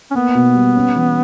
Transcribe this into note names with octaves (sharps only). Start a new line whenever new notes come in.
C#4
A#3 B3
B2
G3
C#4
E3